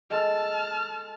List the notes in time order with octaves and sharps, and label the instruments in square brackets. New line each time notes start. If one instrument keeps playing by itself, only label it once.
[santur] G#3 A4 [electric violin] A5 F6